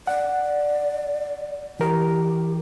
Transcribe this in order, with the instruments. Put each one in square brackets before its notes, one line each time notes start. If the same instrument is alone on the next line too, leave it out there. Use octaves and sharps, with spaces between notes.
[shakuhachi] D5 [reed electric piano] F#5
[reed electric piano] E3 A#4 [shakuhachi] G4